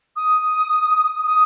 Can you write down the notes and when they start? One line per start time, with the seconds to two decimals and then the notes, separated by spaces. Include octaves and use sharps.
0.16 D#6
1.27 D#6